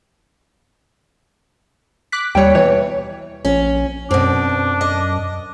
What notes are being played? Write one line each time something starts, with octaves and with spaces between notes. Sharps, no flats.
D6 F#6 B6
D#2 G3 C#5 G5 C#7
B2 E3 C#5
A#1 C#4
F#2 B2 C4 D4
D#5